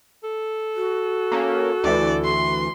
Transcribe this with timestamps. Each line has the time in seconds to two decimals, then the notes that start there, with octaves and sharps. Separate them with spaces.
0.24 A4
0.76 F#4
1.32 A#3 C#4
1.84 D2 E3 D5
2.24 C6